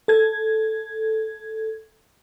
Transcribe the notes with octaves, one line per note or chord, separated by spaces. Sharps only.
A4 G#6